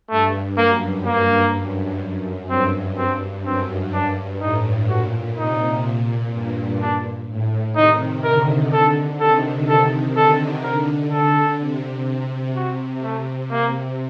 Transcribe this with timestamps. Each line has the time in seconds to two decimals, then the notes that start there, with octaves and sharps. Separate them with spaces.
0.10 G2 A3
0.58 F#2 A#3
1.06 G2 A#3
1.54 F#2
2.50 G2 C4
2.98 C4
3.46 F#2 C4
3.93 G2 D4
4.41 A2 D#4
4.89 A#2 F#4
5.37 C3 D#4
5.85 A#2
6.32 G2
6.81 D4
7.29 A2
7.76 C3 D#3 D#4
8.24 D3 A#4
8.73 A4
9.20 C3 D#3 A4
9.68 C3 D#3 A4
10.16 D3 A4
10.63 D3 A#4
11.11 A4
11.59 C3
12.55 C3 F#4
13.03 A3
13.51 A#3